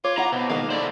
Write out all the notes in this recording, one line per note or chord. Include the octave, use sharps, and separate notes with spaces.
F4 C#5 D6
E4 F#5 A#5
B2 C4
D#3 G#3 A#3 F5
E4 A4 C5 D5